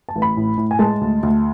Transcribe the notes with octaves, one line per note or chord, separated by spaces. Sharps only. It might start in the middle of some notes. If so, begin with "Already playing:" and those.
A5
A1
B5
A2
A2
G#5
G#3 A5
D2
D2